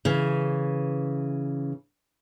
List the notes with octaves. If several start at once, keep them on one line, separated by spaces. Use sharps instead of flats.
C#3 E3